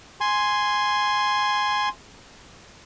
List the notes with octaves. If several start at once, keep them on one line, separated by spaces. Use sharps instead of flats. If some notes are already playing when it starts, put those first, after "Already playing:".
G#5 C6